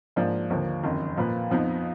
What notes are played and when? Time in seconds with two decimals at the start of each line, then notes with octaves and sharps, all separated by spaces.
0.16 G#2 F3 A#3 D4
0.50 D#2 D3 F3 A#3
0.83 F#1 F2 D#3
1.17 A#2 F3 A#3 F4 B4
1.51 F2 F3 B3 D#4